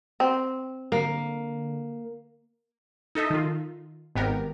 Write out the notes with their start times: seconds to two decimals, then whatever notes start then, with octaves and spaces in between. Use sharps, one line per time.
0.20 C4
0.92 D3 A#3
3.15 D#4 A4 D#5 E5
3.30 D#3 F4
4.15 G#1 B3 G4 A#4